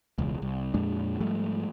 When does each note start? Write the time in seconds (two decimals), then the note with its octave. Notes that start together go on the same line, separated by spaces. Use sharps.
0.18 E1 C#2
0.42 C2
0.74 F2 A#2 G#3 D4
1.20 G#2 F3 G3 A3